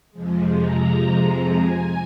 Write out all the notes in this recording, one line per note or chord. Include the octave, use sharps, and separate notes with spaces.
F2 C3 F3 G#3
A#5
G#5